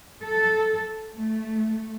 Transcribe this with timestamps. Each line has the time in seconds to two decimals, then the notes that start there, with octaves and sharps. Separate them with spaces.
0.24 A4
1.14 A3